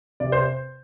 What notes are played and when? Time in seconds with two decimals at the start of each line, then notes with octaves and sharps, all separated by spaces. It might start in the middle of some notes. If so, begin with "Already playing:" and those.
0.20 C3 D5
0.32 C5